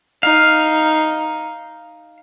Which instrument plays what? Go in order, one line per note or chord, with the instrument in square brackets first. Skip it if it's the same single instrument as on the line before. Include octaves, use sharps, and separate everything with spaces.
[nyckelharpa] D#4 [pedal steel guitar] F5